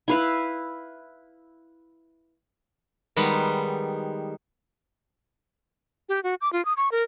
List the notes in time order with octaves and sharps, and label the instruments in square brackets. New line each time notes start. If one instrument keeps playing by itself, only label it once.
[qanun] E4 B4 F5
[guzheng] D#3 G3 G#3 B3 B4
[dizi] G4
F#4
D6
F4
D#6
C#6
A#4